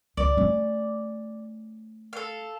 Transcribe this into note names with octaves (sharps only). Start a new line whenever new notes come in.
C#2 D5
A3 C#4
A4 F5